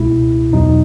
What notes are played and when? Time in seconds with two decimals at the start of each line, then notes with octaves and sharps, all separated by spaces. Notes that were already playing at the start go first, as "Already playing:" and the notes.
Already playing: C#2 B2 G#3 E4
0.52 E2 B2 F#3 D#4